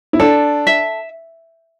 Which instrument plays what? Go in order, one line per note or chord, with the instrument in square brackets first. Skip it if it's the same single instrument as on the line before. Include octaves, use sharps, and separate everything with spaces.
[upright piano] E4
[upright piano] D4 [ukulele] A4
[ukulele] E5